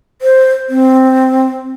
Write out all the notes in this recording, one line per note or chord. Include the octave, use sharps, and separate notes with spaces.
C5
C4